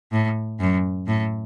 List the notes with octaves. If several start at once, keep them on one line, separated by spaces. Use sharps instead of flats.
A2
F#2
A2